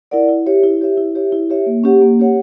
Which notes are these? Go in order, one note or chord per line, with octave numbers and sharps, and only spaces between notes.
E4 A#4 D5 F#5
E4
G4 C#5 E5
E4
G4 C#5 E5
E4
G4 C#5 E5
E4
G4 C#5 E5
A#3
C#4 G4 C#5 F#5
A#3
C#4 G4 C#5 F#5